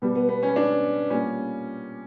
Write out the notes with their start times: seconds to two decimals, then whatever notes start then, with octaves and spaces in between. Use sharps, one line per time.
0.02 B2 G3 B3
0.15 B3
0.28 B3
0.43 C#4
0.56 D4
1.10 A#2 G3 C#4